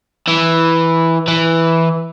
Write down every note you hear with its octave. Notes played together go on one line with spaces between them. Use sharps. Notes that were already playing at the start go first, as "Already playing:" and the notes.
E3
E3